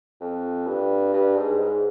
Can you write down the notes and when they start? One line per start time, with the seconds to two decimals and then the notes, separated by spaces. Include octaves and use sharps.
0.21 F2
0.67 G2
1.13 G2
1.36 G#2
1.59 G#2